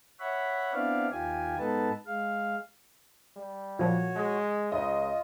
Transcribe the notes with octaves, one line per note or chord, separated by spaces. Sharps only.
C#5 E5 F#5 B5
B3 C4 D4 E4 D5 F5
D#2 D#3 F4 G4 G#5
G#2 B3 D#4 A4 B4 A5
G#3 F5
G3
A#2 F3 F#4 C#5
G#3
C#2 F4 D#5